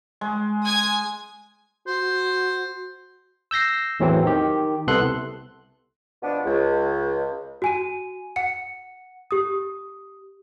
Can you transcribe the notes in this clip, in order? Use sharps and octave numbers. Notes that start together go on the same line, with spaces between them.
G#3
G#5 D#6 G#6
F#4 C5
E6 G6 A#6 C7
E2 A2 E3 F#3 C4
D#3 G4
C2 C3 B3 A4 C6 F#6
B2 F3 B3 D4
C#2
F#4 G#5 D#7
F#5 C#7
G4 D#6